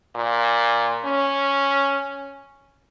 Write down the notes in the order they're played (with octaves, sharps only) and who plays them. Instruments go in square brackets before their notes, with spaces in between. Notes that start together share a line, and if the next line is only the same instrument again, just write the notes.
[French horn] A#2
C#4